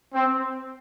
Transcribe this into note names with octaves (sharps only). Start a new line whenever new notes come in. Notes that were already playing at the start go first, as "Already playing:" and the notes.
C4